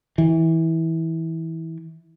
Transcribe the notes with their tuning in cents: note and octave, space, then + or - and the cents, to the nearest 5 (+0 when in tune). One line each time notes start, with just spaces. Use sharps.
E3 -20